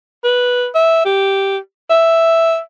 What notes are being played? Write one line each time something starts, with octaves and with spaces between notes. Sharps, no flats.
B4
E5
G4
E5